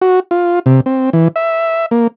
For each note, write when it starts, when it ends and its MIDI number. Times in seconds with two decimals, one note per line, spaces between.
0.02 0.20 66
0.31 0.59 65
0.66 0.81 48
0.86 1.10 60
1.13 1.28 52
1.36 1.86 76
1.91 2.07 58